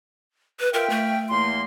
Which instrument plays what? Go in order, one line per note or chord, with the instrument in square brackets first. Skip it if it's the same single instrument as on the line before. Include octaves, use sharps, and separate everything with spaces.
[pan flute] B4
[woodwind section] F4 E5 G5 [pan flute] A#4
[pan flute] A3
[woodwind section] E2 A#3 C6